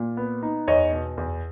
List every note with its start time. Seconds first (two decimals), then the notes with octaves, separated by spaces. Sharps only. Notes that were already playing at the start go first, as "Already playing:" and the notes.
Already playing: A#2
0.17 B3
0.43 D#4
0.68 E2 C#5 D#5
0.92 B2
1.18 E2